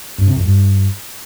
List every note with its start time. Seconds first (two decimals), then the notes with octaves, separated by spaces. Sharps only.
0.18 G2
0.27 C3
0.36 F2
0.45 G2